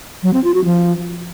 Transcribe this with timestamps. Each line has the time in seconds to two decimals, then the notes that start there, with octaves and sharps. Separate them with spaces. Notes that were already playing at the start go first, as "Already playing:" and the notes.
0.23 F#3
0.34 C4
0.44 F4
0.54 F#4
0.65 F3